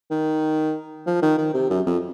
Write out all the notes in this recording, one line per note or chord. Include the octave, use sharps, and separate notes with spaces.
D#3
F3
D#3
D#3
C3
F#2
F2